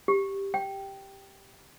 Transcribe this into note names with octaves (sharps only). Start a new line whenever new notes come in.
G4
G5